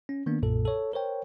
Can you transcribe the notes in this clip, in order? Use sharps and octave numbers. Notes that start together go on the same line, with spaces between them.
C#4
D#3 A#3 B3 D4
B1 F#2 A#2 A4
A4 C#5
A#4 C5 C#5 G5